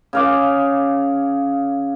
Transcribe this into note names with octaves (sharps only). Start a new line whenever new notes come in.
C#3 F5 D6